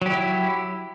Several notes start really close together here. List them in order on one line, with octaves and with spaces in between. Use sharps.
F#3 G4 E4